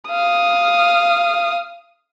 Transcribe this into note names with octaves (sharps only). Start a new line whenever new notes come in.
F5 D#6